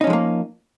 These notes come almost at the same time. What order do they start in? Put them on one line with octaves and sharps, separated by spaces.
D#4 C#4 F3 G#3 A#3